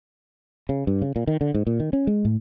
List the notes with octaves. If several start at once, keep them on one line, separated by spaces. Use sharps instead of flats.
C#3
G2
C#3
A#2
D#3
D3
G#2
A#2
D#3
C#4
G#3
A2